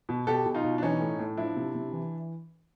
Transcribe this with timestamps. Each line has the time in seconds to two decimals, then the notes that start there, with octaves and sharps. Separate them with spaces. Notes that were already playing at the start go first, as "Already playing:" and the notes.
0.09 B2
0.27 B2 G4 A4
0.45 B2
0.54 D#4 F4
0.64 B2
0.78 D4
0.82 E3 C#4 D#4
1.01 A2
1.19 A2
1.37 F3 D4 E4
1.56 C3
1.75 C3
1.92 E3